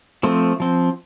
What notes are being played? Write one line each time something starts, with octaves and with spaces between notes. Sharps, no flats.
F3 A3 C4
F3 C4